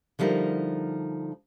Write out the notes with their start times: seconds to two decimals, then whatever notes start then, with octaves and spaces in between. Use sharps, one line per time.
0.19 D3 F3 G3 D#4 E4 A#4